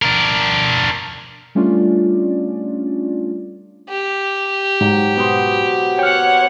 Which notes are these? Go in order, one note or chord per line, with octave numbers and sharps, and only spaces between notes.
D4 A#4
G3 A3 C#4 D4 F4 D5
G4
G#2 F#3
B2 B3 C5
C#5 F#5 G5 F6